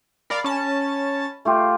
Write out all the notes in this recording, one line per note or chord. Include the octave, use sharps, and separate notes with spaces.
A#4 D5 F5 B5
C#4 A5
A3 F4 G4